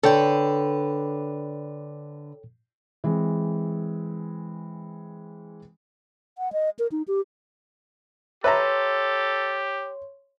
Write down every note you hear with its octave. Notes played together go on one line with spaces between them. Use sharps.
D3 A4 B4 C#5 G5
E3 G#3 C4
F#5
D#5
A#4
D#4
G4
G4 A4 B4 C#5 E5 A#5 C6